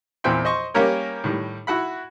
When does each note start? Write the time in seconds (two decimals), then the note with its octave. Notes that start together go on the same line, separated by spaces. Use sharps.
0.24 E2 A#2 C4 E4 G5 C6
0.45 C5 D#5 C6 C#6
0.74 G3 A#3 C#4 G4 A#4 C#5
1.24 A2 D#3 G3
1.67 E4 F#4 F#5 B5